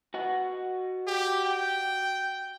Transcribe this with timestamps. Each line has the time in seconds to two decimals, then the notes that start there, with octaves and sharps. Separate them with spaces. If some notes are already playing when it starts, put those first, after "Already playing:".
0.14 F#4 D#5 F#5
1.07 G4
1.45 G5